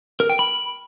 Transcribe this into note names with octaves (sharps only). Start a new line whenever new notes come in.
A#4
G5
B5